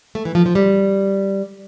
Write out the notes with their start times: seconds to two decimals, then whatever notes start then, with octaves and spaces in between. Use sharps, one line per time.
0.15 A3
0.25 E3
0.35 F3
0.46 F3
0.55 G3